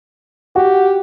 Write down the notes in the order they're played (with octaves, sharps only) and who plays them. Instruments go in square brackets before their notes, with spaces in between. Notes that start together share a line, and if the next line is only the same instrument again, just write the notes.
[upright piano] F#4 [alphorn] G4